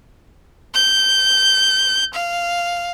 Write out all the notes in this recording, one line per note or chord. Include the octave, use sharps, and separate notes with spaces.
G6
F5